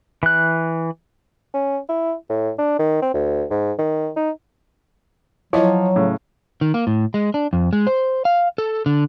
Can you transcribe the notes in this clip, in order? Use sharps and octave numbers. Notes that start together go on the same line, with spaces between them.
E3 F#6
C#4
E4
A2
D4
D#3
C4
D2
G#2
D#3
D#4
F3 F#3 E4 C#5 D#5
A2 C#3
D#3
A#3
A2
G#3
D4
F2
G#3
C5
F5
A4
D3